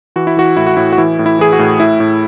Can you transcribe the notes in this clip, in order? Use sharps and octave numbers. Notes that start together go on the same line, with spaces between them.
E3 F#4
E4
E3 F#4
A2 E4
F#4
A2 E4
F#4
E3 E4
A2
E4
E3 G#4
F#4
A2
A2 E4
A2